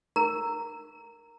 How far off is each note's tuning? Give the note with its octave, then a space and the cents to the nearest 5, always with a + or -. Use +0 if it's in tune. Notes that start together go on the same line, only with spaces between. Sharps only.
A#4 +0 A#5 -10